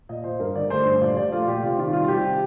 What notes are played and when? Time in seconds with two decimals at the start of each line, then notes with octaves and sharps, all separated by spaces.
0.09 A#2 D#5
0.24 A#2 C5
0.39 G2 A#4
0.55 D3 D5
0.70 A3 C5
0.85 G2 C5
1.01 A#2 D5
1.17 F3 D5
1.32 A3 F4
1.47 A#2 G4
1.63 C3 F4
1.78 D#3 F4
1.93 G3 F4
2.04 F4
2.08 C3 G4